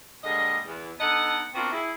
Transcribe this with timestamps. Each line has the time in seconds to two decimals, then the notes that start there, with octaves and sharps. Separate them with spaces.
0.24 A#2 D3 G3 G#3 D#5
0.66 E2
0.99 B3 D4 D#4 A4 D#5 F#5
1.54 B3 C4 D4 F4 F#4 A#4
1.71 E4 G#4